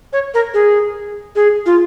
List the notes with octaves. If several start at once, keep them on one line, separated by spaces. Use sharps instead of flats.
C#5
A#4
G#4
G#4
F4